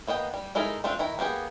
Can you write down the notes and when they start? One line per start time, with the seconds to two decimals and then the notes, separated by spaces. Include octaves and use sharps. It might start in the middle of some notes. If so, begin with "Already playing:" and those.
0.07 A#3 B3 D#5 G5
0.34 G3
0.55 G#3 D#4 E4 A4 A#4
0.84 A3 C4 D4 F4
0.99 D#3 E4 A#5
1.19 A#3 B3 G4 G#4